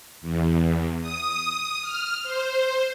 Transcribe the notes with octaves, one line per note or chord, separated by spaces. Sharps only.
E2
D#6
F6
C5